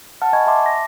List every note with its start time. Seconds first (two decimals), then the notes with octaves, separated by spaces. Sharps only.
0.21 F#5 A5 F6
0.33 D#5 F#5 G#5 B5 C#6 G#6
0.47 E5 A5 C6 D6
0.66 A#6